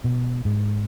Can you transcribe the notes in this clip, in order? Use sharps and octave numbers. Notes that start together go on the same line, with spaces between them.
B2
G#2